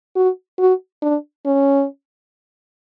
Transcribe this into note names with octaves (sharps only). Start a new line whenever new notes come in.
F#4
F#4
D4
C#4